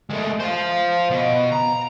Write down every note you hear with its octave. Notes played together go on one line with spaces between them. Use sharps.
G#3 A3
C5 F5
B2
A#5